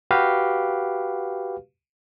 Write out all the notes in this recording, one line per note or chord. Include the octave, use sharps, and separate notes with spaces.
F#4 G4 B4 F5